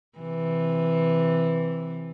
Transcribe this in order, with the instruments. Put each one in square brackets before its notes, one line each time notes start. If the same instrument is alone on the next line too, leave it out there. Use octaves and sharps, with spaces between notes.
[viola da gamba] C3 E3